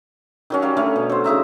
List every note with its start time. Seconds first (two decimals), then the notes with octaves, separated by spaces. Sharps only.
0.50 D#3 F#3 C#4
0.62 G3 A#4 F5
0.77 D3 A3 C#4
0.96 B2
1.09 F#3 C5
1.24 C#3 D#4 E5 A#5